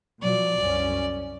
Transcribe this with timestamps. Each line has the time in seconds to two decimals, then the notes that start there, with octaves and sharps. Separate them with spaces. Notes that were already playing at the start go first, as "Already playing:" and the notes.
0.22 B2 F3 F#3 D5
0.58 C2 F#2 C#4